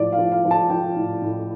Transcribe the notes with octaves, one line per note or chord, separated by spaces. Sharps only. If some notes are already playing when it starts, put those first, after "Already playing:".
Already playing: A2 F3 D5
F5
F3
F5
F3
A5
F3 G5
A2
A2